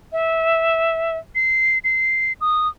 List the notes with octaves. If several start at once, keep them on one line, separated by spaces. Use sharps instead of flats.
E5
C7
C7
D#6